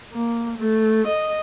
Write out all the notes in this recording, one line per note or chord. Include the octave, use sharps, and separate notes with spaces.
A#3
A3
D#5